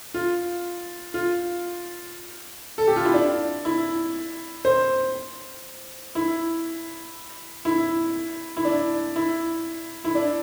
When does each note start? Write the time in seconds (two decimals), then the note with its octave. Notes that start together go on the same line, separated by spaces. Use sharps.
0.14 F4
1.14 F4
2.78 A4
2.88 G4
2.96 F4
3.05 E4
3.14 D4
3.65 E4
4.65 C5
6.15 E4
7.65 E4
8.57 E4
8.65 D4
9.16 E4
10.05 E4
10.15 D4